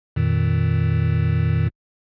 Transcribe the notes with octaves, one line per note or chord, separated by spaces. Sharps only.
F2 A#2 D#3